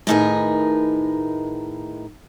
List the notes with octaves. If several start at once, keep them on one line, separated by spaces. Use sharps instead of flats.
A2 D#3 D#4 G#4 A#4 B4